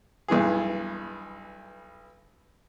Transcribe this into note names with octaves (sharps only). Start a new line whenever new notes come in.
B1 G2 E3 G#4